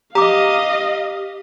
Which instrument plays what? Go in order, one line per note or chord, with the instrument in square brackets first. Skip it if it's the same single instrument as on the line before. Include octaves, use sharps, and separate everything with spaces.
[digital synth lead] G4 [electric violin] D#5 F5 [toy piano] A#5 D6